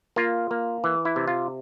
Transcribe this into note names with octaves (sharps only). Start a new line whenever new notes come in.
A#3 F4
A#3
E3
E4
C3
F4